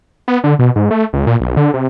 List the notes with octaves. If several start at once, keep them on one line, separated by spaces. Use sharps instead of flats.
B3
D3
B2
G#2
A3
C#2
A#2
B1
D3
C3